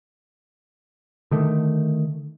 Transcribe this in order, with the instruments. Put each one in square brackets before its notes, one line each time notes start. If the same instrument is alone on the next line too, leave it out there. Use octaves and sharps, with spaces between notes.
[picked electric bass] D3 D#3 A3